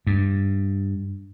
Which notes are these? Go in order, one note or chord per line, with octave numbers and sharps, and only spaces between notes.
G2